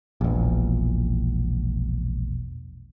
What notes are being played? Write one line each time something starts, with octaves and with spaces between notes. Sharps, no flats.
E1 A#1